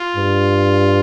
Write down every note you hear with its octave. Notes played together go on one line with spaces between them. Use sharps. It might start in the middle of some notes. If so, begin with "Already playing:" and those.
Already playing: F4
G2